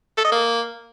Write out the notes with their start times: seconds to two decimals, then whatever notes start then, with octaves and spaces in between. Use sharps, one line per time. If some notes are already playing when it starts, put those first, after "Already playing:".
0.18 A4
0.25 D#5
0.32 A#3